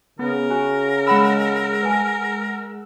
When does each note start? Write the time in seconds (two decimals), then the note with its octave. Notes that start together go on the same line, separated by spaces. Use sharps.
0.19 C#3 B3 A#4
0.50 F#4 G#5
1.07 G#3 F#5 B5 E6
1.83 B4 G#5 A5